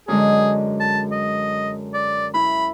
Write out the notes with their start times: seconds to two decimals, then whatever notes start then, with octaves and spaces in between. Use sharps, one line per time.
0.08 F#2 D3 G#3 G#4
0.80 A5
1.11 D#5
1.94 D5
2.34 E4 B5